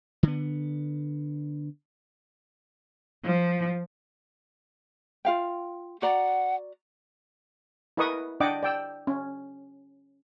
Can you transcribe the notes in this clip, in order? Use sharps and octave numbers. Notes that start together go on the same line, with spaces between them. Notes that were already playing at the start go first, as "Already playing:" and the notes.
D3 B3
F3
F4 F5 G5
F#4 D5 F#5 A#5
E4 A#4 B4 D#5 C#6 D#6
D4 D5 D#5 F#5 G5 D6
D5 G5 E6
C#4